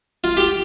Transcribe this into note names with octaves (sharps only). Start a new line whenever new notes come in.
F4
G4